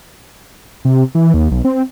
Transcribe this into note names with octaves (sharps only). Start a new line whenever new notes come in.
C3
E3
D#2
B1
C4